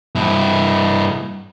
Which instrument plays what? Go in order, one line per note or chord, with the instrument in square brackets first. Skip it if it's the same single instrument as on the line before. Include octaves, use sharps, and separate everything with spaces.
[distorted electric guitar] G2 E4